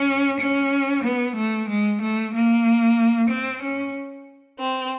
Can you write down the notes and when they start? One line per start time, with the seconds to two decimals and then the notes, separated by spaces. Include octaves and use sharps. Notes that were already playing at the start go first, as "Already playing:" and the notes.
Already playing: C#4
0.39 C#4
1.04 B3
1.36 A3
1.68 G#3
2.00 A3
2.33 A#3
3.29 C4
3.61 C#4
4.58 C4